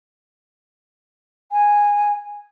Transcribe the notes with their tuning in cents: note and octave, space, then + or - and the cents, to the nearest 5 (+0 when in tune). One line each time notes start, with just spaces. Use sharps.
G#5 -10